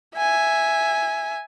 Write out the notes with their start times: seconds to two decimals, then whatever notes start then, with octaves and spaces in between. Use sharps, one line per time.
0.17 E5 G#5